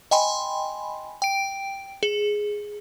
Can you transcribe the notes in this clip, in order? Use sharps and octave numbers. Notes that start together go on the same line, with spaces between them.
D#5 G5 G#5 B5 C6
G5 D7
G#4